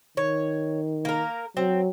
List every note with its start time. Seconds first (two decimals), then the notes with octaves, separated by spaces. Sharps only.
0.17 D#3 C#5
1.05 A#3 A#4
1.57 F#3 C4